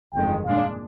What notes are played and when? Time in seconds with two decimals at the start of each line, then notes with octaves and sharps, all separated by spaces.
0.14 G1 F2 D#3 G#3 G5
0.45 A#2 G#3 D4 F5